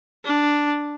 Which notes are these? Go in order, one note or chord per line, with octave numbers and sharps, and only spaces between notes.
D4